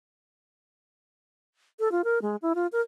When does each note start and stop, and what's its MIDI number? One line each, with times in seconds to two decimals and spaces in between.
1.80 1.91 69
1.92 2.02 65
2.04 2.19 70
2.22 2.36 56
2.42 2.53 64
2.55 2.67 65
2.72 2.81 70